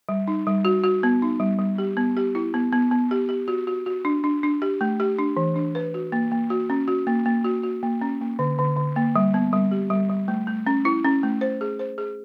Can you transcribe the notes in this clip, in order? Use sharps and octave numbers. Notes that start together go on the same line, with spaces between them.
G3
D#4
G3
F#4
F#4
B3
D#4
G3
G3
G4
B3
G4
E4
B3
B3
B3
G4
G4
F#4
F#4
F#4
D4
D4
D4
G4
A3
G4
D4
E3
D4
B4
F#4
A#3
A#3
F#4
C#4
F#4
A#3
A#3
F#4
F#4
A#3
C#4
A#3
D3
D3
D3
A#3
G3
B3
G3
G4
G3
G3
A3
A3
C#4
E4
C#4
A3
C5
G#4
C5
G#4